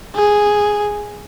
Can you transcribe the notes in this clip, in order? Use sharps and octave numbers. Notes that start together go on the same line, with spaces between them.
G#4